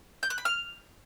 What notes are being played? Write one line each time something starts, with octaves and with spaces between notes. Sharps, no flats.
G6
F#6
B5
F6